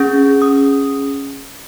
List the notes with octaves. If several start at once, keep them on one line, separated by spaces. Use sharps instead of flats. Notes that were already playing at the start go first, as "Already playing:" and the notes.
Already playing: C#4 G#4
D#6